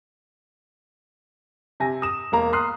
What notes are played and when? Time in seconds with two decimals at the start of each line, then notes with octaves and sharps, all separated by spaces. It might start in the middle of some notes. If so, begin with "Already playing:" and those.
1.80 C3 G#5 A#6
2.02 D#6 E7
2.32 E1 A#3 A#5
2.53 C6 D#6 F6 F#6 C7